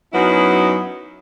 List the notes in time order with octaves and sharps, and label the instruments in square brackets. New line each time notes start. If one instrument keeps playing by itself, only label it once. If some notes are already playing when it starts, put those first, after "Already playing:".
[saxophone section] F#2 F#3 B3 C#4 D#4 E4